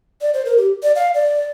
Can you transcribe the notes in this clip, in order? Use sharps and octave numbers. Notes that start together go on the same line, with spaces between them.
D5
C5
A#4
G4
D5
F5
D5